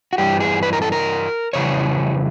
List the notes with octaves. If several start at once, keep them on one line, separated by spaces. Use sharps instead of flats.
F#4
G2 E3 G3 G4
G#4
B4
A#4
A4
A#4
F2 C#3 E3 G3 C#5